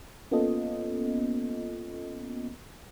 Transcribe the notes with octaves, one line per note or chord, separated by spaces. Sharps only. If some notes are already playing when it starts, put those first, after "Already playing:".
A#3 B3 C#4 F4 A4 D#5